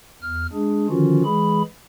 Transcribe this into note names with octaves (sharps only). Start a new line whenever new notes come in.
E2 F6
G#3 D4 G#4
D3 D#3 F3 C#4 F4 F#4
E3 G#3 G#4 B5